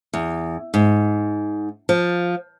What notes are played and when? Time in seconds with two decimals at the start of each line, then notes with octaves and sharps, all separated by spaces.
0.14 E2
0.74 G#2
1.89 F3